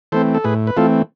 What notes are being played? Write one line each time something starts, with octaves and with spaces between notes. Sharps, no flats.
E3 A3 C4 A4 C5
A4
A2 G#4 B4
B4
E3 A3 C4 F4 A4